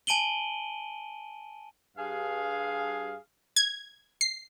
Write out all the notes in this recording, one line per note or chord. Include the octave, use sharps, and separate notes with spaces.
G#5 A5 D7 D#7 F#7 G7
G2 G#4 F5
G#6
C7